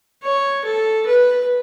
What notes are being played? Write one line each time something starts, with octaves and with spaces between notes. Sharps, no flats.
C#5
A4
B4